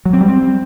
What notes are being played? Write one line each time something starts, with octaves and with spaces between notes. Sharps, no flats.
F#3
C4
G3
C4